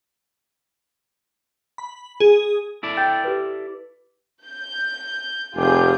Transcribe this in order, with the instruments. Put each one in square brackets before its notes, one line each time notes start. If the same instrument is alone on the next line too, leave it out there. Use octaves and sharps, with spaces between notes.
[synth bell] B5
G#4
[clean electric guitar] E4 A4 D5
[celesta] G5 G6 A6
G4 B4
[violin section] G6
[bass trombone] F1 [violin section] F4 G#4 G6 [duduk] G4